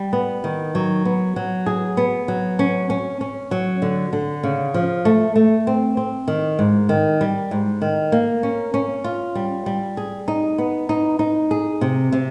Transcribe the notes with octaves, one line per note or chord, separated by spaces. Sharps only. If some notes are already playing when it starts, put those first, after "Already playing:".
Already playing: G3
B3
D#3
F#3
B3
F#3
G#4
B3
F#3
C#4
C#4
C#4
F#3
D3
D3
C#3
F3
A3
A3
C4
C4
D#3
G#2
D#3
G3
G#2
D#3
A#3
C#4
C#4
F4
G3
G3
G#4
D#4
B3
D#4
D#4
G#4
C3
C3